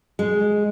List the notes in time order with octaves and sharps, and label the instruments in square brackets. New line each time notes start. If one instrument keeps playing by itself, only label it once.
[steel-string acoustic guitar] G#3